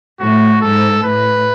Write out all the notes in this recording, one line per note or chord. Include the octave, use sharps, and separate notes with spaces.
A2 F#4
G#2 A4
A2 B4